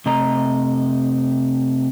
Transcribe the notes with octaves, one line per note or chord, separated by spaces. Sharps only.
C3 A3 D#5 A#5